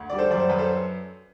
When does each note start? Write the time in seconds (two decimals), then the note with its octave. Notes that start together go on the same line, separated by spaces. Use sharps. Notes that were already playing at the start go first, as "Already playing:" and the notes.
Already playing: D2
0.10 G3 D5
0.18 A4 C5
0.31 F#2 D5
0.40 C5
0.49 F#2 B4
0.58 A4 C5